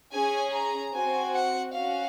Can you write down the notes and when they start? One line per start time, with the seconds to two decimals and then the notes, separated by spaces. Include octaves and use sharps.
0.12 C#4 G#4 G#5
0.53 A#5
0.93 C4 F#4 G#5
1.34 F#5
1.74 C#4 F#4 F5